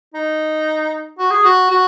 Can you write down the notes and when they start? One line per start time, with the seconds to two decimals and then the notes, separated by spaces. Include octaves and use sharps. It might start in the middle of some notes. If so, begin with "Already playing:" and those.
0.14 D#4
1.18 F#4
1.30 G#4
1.44 F#4
1.71 F#4